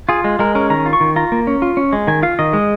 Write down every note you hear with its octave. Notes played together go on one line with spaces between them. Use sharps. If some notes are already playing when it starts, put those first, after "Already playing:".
F4 G#4
G#3
G#3 A#4
C#4 A#4
D#3 A#5
F4
C#6
D#3
F4 A#5
A#3
C#4
F4
C#4
G#3
D#3 G#5
F4 F5
D#3 D#5
G#3